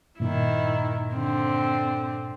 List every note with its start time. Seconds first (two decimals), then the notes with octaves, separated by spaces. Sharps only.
0.20 G2 A#2 D#3 E4
1.13 D3 C4